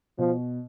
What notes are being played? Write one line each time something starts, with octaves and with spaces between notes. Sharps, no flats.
B2 F3